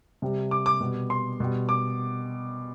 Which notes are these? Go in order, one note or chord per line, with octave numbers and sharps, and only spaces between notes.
C3 G3
D6
D6
B2 G3
C6
B2 G3
D6